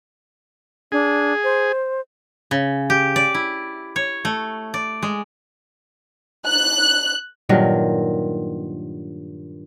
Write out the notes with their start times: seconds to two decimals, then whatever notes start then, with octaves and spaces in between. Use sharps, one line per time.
0.92 D4 G#4
1.44 C5
2.51 C#3
2.90 G4
3.16 D5
3.34 E4
3.96 C#5
4.25 A3
4.74 D5
5.02 G#3
6.47 F#6
7.49 G2 A#2 D#3 F#3